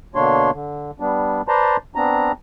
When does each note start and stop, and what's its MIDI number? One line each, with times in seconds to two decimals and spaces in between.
0.15 0.51 47
0.15 0.51 50
0.15 0.51 58
0.15 0.51 62
0.15 0.51 73
0.15 0.51 84
0.53 0.91 50
1.00 1.42 55
1.00 1.42 59
1.00 1.42 62
1.48 1.77 71
1.48 1.77 72
1.48 1.77 74
1.48 1.77 81
1.48 1.77 82
1.48 1.77 84
1.95 2.32 59
1.95 2.32 60
1.95 2.32 62
1.95 2.32 82